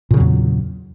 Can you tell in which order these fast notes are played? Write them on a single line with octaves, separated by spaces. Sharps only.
A#2 C#3 F#3 E2